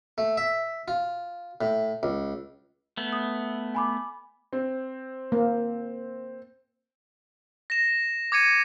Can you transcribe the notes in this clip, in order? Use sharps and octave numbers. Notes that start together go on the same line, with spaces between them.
A3
E5
F4
A2
C#2
A3 B3
D#6
G#5 B5 D6
C4
A#3
A#6 E7
D6 G#6 C#7 D#7